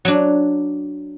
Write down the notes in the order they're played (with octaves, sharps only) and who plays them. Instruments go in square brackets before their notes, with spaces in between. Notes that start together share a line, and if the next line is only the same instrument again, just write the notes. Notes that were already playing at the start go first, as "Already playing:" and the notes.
[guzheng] F#3 D4